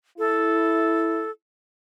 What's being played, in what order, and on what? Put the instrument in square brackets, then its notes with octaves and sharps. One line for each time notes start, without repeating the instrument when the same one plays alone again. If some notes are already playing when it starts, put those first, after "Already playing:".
[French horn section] E4 [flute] A4